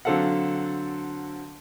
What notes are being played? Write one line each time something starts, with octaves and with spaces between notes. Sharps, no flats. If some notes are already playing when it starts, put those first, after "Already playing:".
D3 F#3 C4 A4 F5 F#5